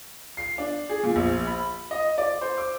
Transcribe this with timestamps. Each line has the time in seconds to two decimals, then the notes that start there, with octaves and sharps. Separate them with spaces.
0.37 C7
0.58 D4
0.89 G#4
1.03 A#2
1.16 A#1
1.47 B5
1.91 D#5
2.18 D5
2.41 C5
2.58 D6